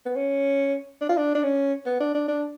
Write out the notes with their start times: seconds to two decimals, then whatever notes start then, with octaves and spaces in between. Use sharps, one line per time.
0.06 B3
0.16 C#4
1.01 D4
1.09 F4
1.17 D4
1.35 D4
1.43 C#4
1.86 B3
2.01 D4
2.15 D4
2.28 D4